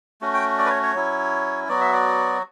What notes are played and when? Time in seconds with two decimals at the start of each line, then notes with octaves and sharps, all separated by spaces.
0.21 A3 C#4 F#4
0.34 G5
0.58 D5
0.66 B4
0.70 C#5
0.83 C#5
0.95 F#3 C#4 E4
1.69 F#3 B3 F#4 D5
1.81 E5
1.93 D5